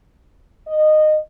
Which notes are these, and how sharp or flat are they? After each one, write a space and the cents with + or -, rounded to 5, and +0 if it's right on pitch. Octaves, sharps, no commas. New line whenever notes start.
D#5 -20